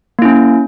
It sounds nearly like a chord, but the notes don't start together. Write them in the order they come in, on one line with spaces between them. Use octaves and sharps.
A#3 E4 C#4